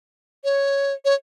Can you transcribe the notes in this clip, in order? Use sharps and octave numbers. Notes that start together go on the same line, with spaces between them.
C#5
C#5